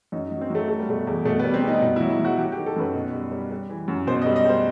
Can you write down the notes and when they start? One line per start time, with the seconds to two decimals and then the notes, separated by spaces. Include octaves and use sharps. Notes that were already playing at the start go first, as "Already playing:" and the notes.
0.12 F#2 D#4
0.27 D#4
0.31 F#3
0.41 C4
0.50 F#3 A3
0.68 G3 A3
0.79 G3
0.88 B2 A3
1.07 E2
1.25 B2 A3
1.39 B3
1.45 G3
1.54 C4
1.62 G3
1.68 D#4
1.81 B2 D#4
1.96 E4
2.00 F#3
2.10 E4
2.20 F#3
2.25 F#4
2.38 F#3 G4
2.52 G4
2.57 D#3
2.66 A4
2.76 F#2 B4
2.94 B2
3.13 G3
3.32 G3
3.51 G3
3.70 E3
3.88 F#2
4.07 B2 C5
4.22 D#5
4.26 G3
4.36 D#5
4.45 G3 C5